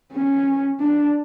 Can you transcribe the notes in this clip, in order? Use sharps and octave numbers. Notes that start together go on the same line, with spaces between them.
C#4
D4